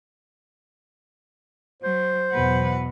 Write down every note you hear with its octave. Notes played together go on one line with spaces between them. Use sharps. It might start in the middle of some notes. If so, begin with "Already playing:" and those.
F#3 C5
E2 B2 F#3 B4 F#5